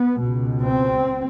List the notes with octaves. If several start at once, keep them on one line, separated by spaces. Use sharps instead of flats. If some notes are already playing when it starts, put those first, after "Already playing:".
Already playing: B3
C#2 B2
C4